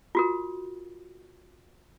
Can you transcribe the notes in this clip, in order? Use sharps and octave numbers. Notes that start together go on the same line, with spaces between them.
F4 F#4 A#4